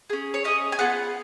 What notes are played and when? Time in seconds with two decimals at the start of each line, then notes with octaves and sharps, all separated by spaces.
0.10 C#4 G#4
0.34 C#5
0.45 C#4 G#4 D#5
0.72 G#5
0.79 B3 F4 G#4 F#5